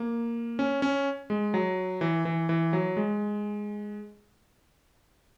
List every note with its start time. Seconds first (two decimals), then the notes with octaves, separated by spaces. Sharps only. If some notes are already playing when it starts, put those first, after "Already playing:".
Already playing: A#3
0.59 C#4
0.82 C#4
1.30 G#3
1.54 F#3
2.01 E3
2.25 E3
2.49 E3
2.73 F#3
2.97 G#3